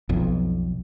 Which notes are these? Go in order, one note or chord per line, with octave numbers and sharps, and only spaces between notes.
B1 F2